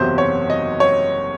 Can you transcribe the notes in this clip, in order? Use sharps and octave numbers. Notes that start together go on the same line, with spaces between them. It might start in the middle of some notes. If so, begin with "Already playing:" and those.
Already playing: F#1 E2 C3 F#3 C5
C#5
D#5
C#5